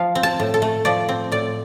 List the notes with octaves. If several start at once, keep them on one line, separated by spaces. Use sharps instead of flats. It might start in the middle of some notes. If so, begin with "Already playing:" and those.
Already playing: F3 F5
C4
A5
A2
A4
A3
F3 D5
C4
A2 D5